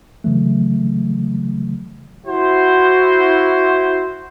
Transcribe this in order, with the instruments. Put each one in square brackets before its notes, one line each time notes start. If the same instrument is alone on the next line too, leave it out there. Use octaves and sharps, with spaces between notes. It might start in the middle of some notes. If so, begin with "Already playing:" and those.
[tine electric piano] C#3 E3 F#3 A3
[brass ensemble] E4 F#4 C5